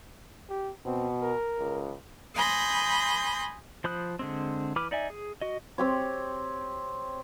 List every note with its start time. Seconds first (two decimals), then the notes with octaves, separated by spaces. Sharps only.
0.49 G4
0.86 B2 C4
1.22 A#4
1.58 C#2
2.35 G#5 B5 C6 D#6 G6 A#6
3.84 F3 C5 B5 D#6 F#6
4.19 D3 G#3 C4
4.76 E3 B4 B5 D6 F6
4.91 D#4 D5 E5 G#5
5.10 G#4
5.41 F#4 D#5
5.78 C4 G4 C#5